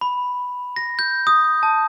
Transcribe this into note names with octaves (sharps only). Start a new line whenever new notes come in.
B5
A#6
G6
D#6
A5